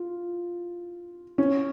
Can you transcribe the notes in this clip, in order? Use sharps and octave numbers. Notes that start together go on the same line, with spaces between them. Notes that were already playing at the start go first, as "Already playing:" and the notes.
Already playing: F4
C#4